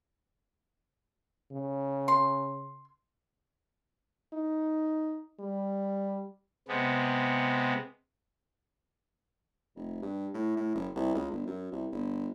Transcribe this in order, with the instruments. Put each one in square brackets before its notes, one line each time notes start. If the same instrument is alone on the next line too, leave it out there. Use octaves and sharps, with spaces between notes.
[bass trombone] C#3
[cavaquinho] C6
[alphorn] D#4
G3
[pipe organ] C3 G#3 B3
[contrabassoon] F1
G2
A2
A2
F#1
C2
C#2
G1
F#2
C2
G1